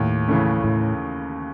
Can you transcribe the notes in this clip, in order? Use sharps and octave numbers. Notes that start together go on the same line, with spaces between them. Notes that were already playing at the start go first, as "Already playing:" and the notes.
Already playing: D#2 A2
C#3 E3 A3 C#4
A2